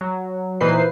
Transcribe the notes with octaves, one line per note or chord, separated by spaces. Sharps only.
F#3
A#2 E3 D#4 B4 C5 C7